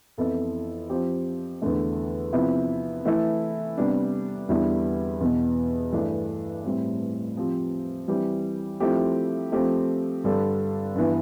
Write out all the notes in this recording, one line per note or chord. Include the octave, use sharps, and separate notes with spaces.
F2 E3 B3 E4 A4
F3 C4 G4
E2 D3 A3
C3 F3 B3 E4
E3 A3 E4 A4
C3 G3 B3 D4
E2 D3 G3 B3 E4
E2 B2 B3
G2 E3 A3 D4
A2 G3 C4
F3 C4 G4
E3 G3 C4 G4
F3 A3 C4 E4 G4
F3 A3 C4 G4
G2 D3 G3 D4 A4
G2 E3 B3